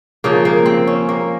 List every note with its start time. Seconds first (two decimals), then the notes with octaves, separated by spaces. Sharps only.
0.24 C#3 F3 A#3
0.45 A#3
0.66 C4
0.87 C#4
1.09 A#3